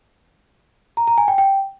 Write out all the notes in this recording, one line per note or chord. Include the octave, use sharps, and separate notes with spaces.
A#5
A#5
G#5
G5
G5